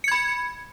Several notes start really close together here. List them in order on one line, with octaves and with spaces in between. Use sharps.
C#7 G#6 B5